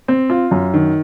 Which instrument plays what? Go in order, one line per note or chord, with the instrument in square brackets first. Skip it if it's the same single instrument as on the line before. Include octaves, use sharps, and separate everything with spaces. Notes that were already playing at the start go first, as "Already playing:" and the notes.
[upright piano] C4
F4
F#2
D#3